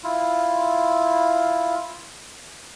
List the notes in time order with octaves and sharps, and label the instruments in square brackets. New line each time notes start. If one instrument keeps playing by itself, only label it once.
[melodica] E4 F4